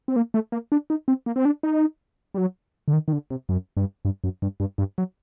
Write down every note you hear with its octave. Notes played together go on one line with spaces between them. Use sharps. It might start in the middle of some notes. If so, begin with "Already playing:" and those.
C4
A#3
A3
A#3
D4
D#4
C4
A#3
C4
D4
D#4
G3
F#3
D3
D#3
D#3
D3
C3
F#2
G2
G2
F#2
G2
G2
G2
F#3